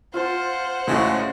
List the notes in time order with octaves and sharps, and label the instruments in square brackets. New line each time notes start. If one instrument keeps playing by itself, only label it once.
[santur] F4 F5 A5 [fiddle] C5 F#5
[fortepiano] A2 F#4 [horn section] C#3 G#3